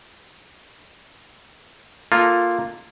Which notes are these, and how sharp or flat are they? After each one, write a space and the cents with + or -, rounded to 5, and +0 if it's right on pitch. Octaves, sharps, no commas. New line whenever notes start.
A#3 +0 F4 +0 A4 +0